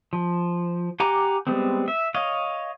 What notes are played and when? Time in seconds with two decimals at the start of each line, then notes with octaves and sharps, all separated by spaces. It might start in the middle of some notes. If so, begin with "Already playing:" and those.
0.13 F3
1.00 G4 F#5 G#5 A#5 D6
1.47 G3 G#3 B3 C4
1.88 E5
2.14 C#5 D#5 F5